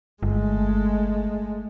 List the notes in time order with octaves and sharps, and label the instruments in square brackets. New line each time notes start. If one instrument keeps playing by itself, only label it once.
[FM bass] G1 [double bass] G#3 A3